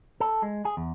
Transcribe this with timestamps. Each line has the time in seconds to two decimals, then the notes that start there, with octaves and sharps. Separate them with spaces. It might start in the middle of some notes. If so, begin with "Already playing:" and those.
0.20 A4
0.43 G#3
0.65 G#4
0.77 E2